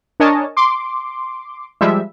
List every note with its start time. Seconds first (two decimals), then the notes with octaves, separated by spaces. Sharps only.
0.20 D4 A#4 C#5 D#5 G#5 A5
0.57 C6 D6
1.81 F3 G3 G#3 E5